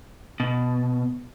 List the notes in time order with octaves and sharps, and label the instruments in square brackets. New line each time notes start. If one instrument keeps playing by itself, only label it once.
[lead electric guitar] B2